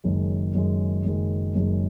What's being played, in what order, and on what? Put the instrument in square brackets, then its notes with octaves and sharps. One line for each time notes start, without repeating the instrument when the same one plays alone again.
[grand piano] F#1 F#2 D#3 G#3
F#1 F#2 D#3 G#3
F#1 F#2 D#3 G#3
F#1 F#2 D#3 G#3